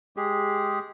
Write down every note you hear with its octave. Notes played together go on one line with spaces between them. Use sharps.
G#3 G4 G#4